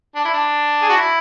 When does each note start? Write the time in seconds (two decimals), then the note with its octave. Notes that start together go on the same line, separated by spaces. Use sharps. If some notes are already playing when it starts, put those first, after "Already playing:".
0.15 D4
0.25 E4
0.33 D4
0.82 G#4
0.89 F#4
0.97 E4